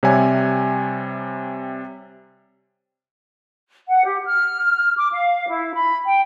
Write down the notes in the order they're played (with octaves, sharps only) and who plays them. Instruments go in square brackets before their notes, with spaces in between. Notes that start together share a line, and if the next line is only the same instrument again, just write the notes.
[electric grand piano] C3 G3 C#5 E5 G#5
[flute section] F#5
G4
F6
D6
F5
E4
B5
G5